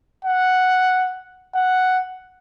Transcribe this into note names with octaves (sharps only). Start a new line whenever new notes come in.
F#5
F#5